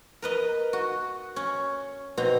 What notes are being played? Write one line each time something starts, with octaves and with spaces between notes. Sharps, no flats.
A#4 B4 D#5
F#4
C#4
B2 C4 A#5